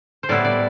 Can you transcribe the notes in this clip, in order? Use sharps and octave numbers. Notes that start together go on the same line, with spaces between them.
C5
A2 G3 B3 E4 D5
D5